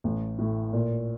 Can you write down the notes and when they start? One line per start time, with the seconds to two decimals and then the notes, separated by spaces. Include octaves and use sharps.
0.04 A1
0.39 A2
0.73 A#2